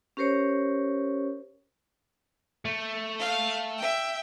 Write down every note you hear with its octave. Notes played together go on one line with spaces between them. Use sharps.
C#4 G4 A#4 C5 C#5
A3
F5
E5 G5